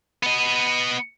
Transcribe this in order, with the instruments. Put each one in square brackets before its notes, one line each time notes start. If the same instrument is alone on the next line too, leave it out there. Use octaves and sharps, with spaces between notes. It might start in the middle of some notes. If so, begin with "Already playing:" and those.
[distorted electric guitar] B3 D#5